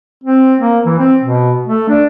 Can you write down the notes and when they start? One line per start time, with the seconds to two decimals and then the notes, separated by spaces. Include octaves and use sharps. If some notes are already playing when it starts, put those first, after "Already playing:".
0.23 C4
0.59 A#3
0.86 E3
0.99 C4
1.23 B2
1.67 A3
1.89 D4